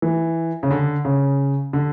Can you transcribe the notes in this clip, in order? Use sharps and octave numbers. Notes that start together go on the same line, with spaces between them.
E3
C#3
D3
C#3
D3